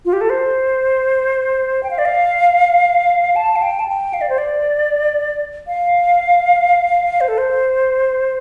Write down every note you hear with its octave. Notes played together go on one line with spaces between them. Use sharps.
F4
G4
A4
C5
G5
F5
D5
F5
A5
F5
G5
A5
G5
F5
D5
C5
D5
F5
C5
A4
C5